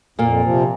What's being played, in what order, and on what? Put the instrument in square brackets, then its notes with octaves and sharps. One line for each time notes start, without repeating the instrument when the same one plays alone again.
[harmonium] F2 [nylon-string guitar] A#2 A#3
[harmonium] C3 F3